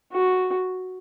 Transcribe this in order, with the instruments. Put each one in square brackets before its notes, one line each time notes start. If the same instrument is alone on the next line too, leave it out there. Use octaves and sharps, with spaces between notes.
[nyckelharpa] F#4